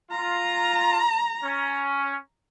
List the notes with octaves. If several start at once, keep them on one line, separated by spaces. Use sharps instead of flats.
F4 A#5
C#4